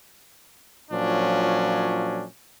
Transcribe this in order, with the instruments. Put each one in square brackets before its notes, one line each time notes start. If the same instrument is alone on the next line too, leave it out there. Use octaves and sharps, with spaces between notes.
[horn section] A#2 F3 F#3 C#4 D4